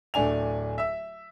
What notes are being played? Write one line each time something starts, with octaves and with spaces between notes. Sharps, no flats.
D1 A3 D4 G#5 F7
E5 E6